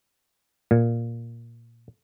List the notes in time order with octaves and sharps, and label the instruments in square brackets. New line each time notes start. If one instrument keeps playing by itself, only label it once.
[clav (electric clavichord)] A#2